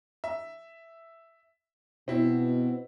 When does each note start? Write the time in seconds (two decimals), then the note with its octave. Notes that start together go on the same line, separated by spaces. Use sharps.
0.24 E5
2.08 B2 C4 E4